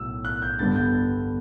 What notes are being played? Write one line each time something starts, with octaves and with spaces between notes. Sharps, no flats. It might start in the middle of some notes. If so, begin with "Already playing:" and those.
Already playing: B1 A2 F#3 A3 E6
F#6
G6
G1 G2 D3 G3 B3 A6
G6